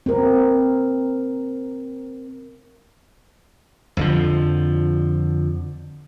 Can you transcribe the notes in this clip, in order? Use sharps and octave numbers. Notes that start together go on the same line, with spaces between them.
C4 A#4
F2 D3 F3